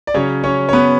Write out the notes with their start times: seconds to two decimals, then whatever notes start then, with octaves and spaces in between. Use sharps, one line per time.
0.07 D5
0.14 C#3 F#3 C#4 C#5
0.44 C#4 C#5
0.69 C#5
0.73 B3 B4